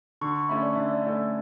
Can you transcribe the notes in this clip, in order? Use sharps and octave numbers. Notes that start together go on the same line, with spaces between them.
D3 C#6
C#6
A3 C#4 E4 A4 B5
D5
D3 E5
D5
A3 C#4 E4 A4